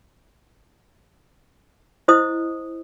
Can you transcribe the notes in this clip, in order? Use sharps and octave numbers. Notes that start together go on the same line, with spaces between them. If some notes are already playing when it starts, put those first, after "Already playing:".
E4 C5 D#5 D#6